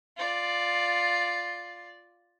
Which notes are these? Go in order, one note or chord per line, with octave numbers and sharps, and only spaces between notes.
F4 D5